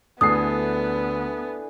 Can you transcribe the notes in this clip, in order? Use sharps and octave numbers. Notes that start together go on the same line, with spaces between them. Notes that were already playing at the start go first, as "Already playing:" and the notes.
D2 D3 E3 B3 G#4 D#6 C7